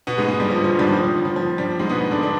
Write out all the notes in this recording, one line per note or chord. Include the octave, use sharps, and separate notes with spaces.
B2 B3
G#2 G#3
G#2 G#3
G2 G3
F3
F3
G2 G3
D#3
F3
F3
F3
F3
G2 G3
G#2 G#3
B2 B3
D3 D4
D3 D4